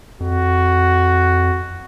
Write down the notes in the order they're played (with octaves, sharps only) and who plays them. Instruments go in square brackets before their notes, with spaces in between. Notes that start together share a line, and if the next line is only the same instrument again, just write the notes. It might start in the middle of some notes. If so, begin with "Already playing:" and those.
[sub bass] F2 [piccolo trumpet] F#4